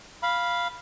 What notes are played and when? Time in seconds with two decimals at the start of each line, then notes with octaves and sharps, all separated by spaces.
0.23 F5 B5